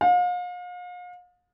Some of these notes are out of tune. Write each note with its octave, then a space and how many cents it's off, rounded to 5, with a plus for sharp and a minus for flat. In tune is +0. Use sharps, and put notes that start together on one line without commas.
F5 +40